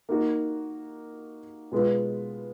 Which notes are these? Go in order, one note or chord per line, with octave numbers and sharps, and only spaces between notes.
A#3 D#4 F#4
B2 G#3 B3 F4 B4